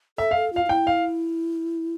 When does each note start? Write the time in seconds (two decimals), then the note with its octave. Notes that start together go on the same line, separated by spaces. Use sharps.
0.18 A4 E5
0.31 A4 F5
0.53 F4 F5
0.65 F4
0.69 E4 G5
0.87 F5